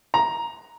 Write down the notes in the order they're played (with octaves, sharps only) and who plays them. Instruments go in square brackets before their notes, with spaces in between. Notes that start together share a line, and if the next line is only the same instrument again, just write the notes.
[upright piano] A#5